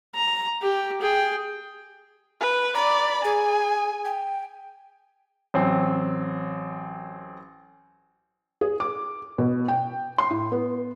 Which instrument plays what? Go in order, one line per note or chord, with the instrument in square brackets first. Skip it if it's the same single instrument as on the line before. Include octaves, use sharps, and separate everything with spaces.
[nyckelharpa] A#5
G4
G#4 G5
[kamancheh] B4
[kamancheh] D5 B5 [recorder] A#5
[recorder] G#4 [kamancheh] G#5
[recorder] G5
[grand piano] A1 F#3 C4
[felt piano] G#4
D6
B2
G5
C6
A2
B3